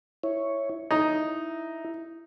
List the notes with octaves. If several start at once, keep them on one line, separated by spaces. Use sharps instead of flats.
E4 C#5
D#4 E4